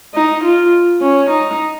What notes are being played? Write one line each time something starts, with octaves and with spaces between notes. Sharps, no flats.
D#4
F4
C#4
D#4